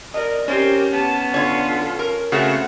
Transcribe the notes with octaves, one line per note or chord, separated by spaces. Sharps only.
A#4 D5 D#5
C4 C#4 G4 A#4
B3 A5
D3 F4 A4 C#5
A#4
C#3 A3 C4 F#4 F#5